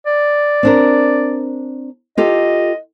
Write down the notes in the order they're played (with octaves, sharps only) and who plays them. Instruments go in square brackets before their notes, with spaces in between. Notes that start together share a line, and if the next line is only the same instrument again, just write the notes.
[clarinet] D5
[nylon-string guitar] C4 D4 A#4
[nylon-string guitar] F4 G4 A4 [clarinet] D#5